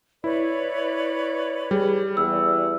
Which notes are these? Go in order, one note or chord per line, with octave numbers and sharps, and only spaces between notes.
E4 B4 C#5 D5
G3 G#4
E2 E6